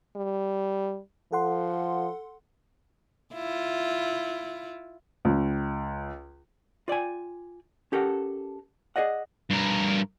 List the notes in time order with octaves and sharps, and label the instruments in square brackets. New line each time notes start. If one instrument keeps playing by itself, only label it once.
[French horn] G3
[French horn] F3 [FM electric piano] A4 F#5 C6
[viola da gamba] E4 F4
[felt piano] C#2
[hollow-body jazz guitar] F4 D5 G5 G#5
C#4 G4 A4 A#4 F#5
G#4 A4 D5 D#5 F#5
[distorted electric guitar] G2 A#4